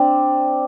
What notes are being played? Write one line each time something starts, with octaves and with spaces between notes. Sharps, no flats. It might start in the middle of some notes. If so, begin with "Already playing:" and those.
Already playing: C4 D4